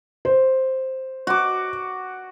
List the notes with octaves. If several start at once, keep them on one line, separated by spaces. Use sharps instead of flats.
C5
F#4 D6